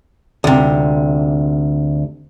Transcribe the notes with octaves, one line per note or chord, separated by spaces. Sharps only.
D2 C3